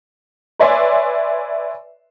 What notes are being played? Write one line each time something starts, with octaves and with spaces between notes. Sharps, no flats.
B4 C#5 D5 E5 G#5 C6